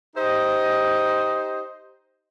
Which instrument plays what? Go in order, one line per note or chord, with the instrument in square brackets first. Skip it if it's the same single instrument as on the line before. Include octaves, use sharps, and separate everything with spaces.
[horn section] D#4 G4 C5 D#5